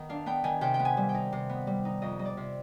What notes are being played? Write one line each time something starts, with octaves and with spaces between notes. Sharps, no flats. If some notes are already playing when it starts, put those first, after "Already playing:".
Already playing: D#3 B3
D4 F5
B3 G5
D#3 G#5
C3 G5
G5
B3
G#5
G3
G5
D#4
C3
B3
G3
D#4
F2 D#5
G3 D#5
D5
C3